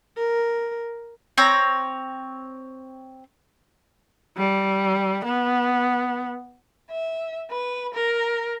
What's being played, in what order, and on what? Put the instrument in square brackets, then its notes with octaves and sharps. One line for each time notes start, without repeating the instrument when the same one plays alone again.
[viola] A#4
[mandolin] C4 C#5 A#5
[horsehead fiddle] G3
B3
[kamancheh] E5
B4
A#4